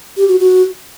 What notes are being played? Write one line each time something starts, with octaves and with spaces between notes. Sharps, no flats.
G4
F#4
F#4